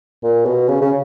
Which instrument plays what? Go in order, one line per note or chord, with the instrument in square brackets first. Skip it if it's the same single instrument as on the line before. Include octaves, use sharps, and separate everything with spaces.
[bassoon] A#2
B2
C#3
C#3